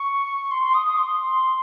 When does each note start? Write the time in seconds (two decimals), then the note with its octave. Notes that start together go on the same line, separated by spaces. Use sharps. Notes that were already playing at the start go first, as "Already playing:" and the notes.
Already playing: C#6
0.51 C6
0.62 C6
0.74 D#6
0.86 D#6
0.97 C6